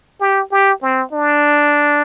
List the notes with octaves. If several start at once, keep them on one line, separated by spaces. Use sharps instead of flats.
G4
G4
C4
D4